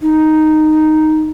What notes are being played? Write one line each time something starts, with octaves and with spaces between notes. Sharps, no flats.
D#4